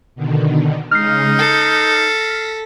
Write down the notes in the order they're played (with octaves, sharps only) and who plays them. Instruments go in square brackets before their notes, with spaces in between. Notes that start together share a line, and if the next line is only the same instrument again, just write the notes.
[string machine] B2 D3 D#3
[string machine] C#3 G#3 [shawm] D#4 [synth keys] F6 C7
[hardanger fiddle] A4 [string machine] A#6 B6